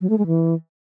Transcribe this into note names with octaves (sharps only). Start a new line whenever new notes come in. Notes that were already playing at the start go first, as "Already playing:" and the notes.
F#3
A3
G#3
E3